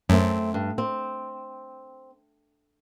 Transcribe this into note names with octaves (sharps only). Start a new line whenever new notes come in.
F#2 A3 C4
G2
C4